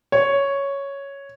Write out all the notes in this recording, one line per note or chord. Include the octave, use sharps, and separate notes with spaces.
C#5